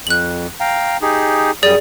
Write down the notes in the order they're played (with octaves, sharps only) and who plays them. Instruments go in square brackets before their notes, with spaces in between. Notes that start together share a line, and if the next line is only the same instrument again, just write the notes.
[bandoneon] F2 [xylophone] F#6 F#7
[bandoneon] F5 G5 A#5
D#4 G4 G#4
[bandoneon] F#2 G3 D#6 [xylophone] G#4 D5